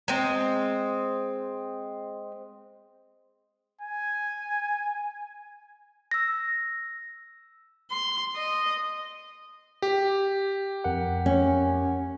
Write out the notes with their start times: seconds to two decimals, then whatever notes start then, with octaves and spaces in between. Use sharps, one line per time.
0.08 G#3 C4
3.81 G#5
6.11 E6 A#6
7.91 C6
8.35 D#5
9.82 G4
10.84 F2 A#4 F#5
11.26 C#4